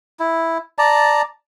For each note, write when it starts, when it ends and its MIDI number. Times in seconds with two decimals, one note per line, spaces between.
0.20 0.58 64
0.79 1.22 74
0.79 1.22 81
0.79 1.22 82